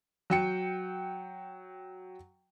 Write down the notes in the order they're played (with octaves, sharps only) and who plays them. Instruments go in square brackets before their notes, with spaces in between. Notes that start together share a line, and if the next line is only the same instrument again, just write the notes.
[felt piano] F#3 G5 C#7